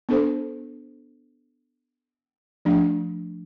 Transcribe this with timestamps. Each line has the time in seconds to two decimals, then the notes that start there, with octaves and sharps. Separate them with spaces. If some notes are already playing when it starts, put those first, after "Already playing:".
0.09 B3 D4 A4 C5
2.65 F3 A3 D4